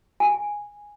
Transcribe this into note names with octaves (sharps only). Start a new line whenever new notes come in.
G#5